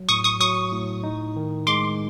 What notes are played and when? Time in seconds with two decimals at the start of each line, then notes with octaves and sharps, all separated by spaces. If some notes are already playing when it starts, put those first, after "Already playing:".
Already playing: F#3
0.09 A2 C#6 D#6
0.24 C#6 D#6
0.40 F#3 C#6 D#6
0.72 A2
1.03 D#4
1.36 D#3
1.67 G#3 C6 D6